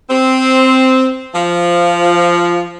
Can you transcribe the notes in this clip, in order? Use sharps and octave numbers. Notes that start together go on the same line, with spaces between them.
C4
F3